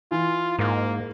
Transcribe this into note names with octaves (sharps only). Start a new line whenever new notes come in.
E3 F4
G#2 A#3